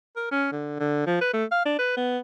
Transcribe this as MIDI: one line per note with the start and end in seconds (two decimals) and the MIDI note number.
0.16 0.30 70
0.31 0.47 61
0.52 0.77 50
0.80 1.04 50
1.06 1.16 53
1.21 1.29 71
1.33 1.44 57
1.51 1.63 77
1.66 1.74 62
1.79 1.92 71
1.97 2.18 59